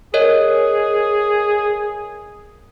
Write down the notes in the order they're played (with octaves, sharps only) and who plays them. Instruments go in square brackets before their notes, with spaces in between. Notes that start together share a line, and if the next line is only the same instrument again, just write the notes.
[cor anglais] G#4 [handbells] A#4 C#5 D#5